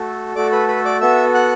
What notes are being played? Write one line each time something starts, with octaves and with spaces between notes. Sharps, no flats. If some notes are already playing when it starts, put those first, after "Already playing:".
Already playing: A3 F#4 A4
A3 F#4 A4 D5 D6
B4 B5
B4 B5
D5 D6
B3 F#4 A4 E5 E6
F#5 F#6